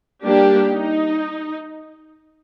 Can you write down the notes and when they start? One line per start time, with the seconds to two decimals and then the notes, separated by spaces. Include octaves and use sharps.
0.24 G3 A#3 D4 G4
0.70 D#4